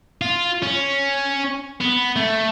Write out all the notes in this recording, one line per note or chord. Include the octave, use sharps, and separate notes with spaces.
F4
C#4
B3
A3